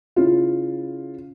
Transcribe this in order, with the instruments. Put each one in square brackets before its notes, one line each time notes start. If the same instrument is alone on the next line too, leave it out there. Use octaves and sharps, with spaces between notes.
[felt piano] C#3 E4 F4